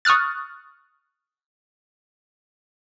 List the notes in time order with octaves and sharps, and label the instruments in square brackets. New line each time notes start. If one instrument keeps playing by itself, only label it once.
[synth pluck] C#6 D#6 F6 F#6 A6